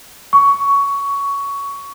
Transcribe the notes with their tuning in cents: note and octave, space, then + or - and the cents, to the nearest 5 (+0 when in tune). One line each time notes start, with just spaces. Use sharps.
C#6 +15